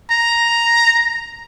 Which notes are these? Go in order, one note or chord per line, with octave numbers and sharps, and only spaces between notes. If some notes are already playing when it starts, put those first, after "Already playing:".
A#5